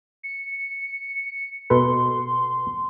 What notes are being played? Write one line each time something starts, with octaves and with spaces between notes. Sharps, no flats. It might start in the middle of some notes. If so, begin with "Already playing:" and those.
C#7
B2 A4 B4 C6